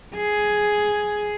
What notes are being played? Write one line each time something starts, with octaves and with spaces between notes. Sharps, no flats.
G#4